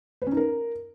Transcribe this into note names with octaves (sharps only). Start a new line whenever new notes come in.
B4
C#4
D#4
A#4